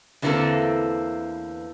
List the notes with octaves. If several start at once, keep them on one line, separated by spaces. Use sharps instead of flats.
E2 D3 E3 A#3 C4 A4